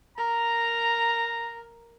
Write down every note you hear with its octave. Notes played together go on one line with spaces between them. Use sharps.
A#4 A#5